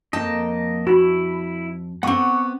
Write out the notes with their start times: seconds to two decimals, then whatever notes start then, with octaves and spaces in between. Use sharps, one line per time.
0.13 F2 A#3 D#5 G5 A5
0.87 E4 F#4 B5
2.03 B3 C4 F#5 C#6 D6